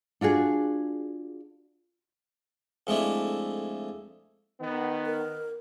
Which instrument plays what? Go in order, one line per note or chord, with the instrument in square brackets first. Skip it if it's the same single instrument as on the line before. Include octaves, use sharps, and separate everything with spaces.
[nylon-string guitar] D4 F4 F#4 G#4
[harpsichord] F2 G#3 A3 D4 E4
[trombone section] D#3 B3
[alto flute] A#4